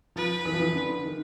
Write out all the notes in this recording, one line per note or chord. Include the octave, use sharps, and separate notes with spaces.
F3 B4
E3
F3
E3
D3
D#3